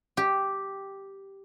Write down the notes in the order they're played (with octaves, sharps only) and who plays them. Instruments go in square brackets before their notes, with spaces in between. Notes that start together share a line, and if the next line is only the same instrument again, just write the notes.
[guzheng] G4